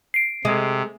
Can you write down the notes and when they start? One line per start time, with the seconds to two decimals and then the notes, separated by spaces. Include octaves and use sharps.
0.14 C7 D7
0.45 C3 G#3